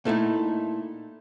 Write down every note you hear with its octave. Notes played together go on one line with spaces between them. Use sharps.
A#2 A3 D#4 E4